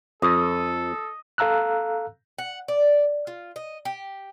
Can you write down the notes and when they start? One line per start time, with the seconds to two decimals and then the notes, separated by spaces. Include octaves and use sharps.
0.22 F2 A4 D#5
1.38 A4 F5 A#5 E6 F#6
2.38 F#5
2.68 D5
3.27 F4
3.56 D#5
3.85 G4